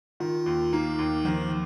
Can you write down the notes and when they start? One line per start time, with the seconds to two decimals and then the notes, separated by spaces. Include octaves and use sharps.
0.20 D#3 F4
0.46 D#2
0.73 A#3 D#4
0.99 D#2
1.25 D#3 F3